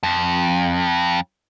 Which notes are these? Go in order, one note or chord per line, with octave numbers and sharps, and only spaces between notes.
F2